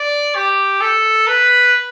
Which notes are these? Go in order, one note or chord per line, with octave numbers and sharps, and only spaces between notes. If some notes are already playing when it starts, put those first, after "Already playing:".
Already playing: D5
G4
A4
B4